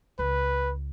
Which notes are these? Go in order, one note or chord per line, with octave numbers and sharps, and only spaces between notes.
C#2 B4